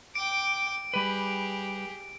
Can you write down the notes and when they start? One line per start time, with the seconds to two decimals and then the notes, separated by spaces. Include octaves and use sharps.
0.15 G5 D6 D7
0.94 G3 G4 G#4 B4